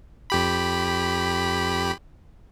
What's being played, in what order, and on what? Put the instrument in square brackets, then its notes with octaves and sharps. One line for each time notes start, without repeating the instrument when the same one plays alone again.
[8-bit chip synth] F2 G4 B5